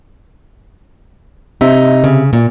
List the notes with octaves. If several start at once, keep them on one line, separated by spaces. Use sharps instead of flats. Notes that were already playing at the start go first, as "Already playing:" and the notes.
C3 D#4 E5
C#3
A#2